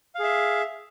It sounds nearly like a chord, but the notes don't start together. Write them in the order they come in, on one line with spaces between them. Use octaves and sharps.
F5 G#4 E5